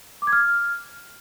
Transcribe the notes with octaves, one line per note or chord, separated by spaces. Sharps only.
D6
G#6
F6